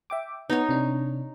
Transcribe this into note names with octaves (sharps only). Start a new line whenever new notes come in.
E5 G5 D6
B3 D#4 B4 C#5 F#5
C3 D4